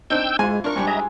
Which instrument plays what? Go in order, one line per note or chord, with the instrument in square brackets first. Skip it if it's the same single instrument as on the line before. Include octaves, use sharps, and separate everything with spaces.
[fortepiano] C4 D4 D#4 [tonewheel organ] G5 E6 G6
[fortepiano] G#2 G#5 C6 [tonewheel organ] G#3 [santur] E4 F4
[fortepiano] D4 A#4 [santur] C6 [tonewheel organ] C#6
[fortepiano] G#2 G3 D4 [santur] G#5
[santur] G#4 [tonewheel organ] D#5 E5 A#5